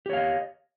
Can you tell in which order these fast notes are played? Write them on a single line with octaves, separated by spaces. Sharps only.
G4 C#5 F5 D#5